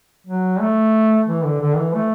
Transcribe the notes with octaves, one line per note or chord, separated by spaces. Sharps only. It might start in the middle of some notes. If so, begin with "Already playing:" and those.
F#3
A3
E3
D3
D3
E3
A3